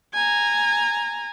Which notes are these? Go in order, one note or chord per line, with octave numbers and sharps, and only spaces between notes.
G#5 A#5